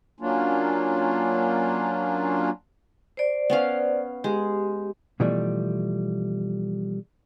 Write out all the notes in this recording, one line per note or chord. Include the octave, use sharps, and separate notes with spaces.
F#3 A#3 C#4 D4 F4
C5 D5
B3 C#4 F5
G#3 G4
B2 E3 F3 G3 A3